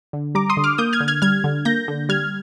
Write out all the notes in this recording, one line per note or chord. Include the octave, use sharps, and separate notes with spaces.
D3
G3 A#5 D6
C6 D#6
D3
D6 F6
A#3 D#6 G6
F6 G#6
D3
F6 G#6
G3 F6 G#6
D3
A#3 G6 A#6
D3
G3 F6 G#6